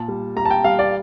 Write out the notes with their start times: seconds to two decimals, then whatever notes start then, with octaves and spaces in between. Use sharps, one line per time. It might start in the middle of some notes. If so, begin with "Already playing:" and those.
Already playing: A#2 A5
0.08 G3
0.36 G3 A#5
0.45 A5
0.50 G5
0.64 G3 F5
0.79 D5